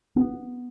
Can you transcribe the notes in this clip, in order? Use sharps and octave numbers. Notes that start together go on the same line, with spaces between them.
B3